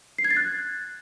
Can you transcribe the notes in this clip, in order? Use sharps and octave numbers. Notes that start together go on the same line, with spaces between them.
C7
G#6
A6
F#6